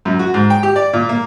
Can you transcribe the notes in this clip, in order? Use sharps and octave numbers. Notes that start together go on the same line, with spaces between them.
F#2
F#4
G#2
G5
G4
D5
A#2
A#3